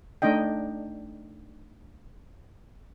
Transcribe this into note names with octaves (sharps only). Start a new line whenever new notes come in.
A3 D4 D#4 D#5 G5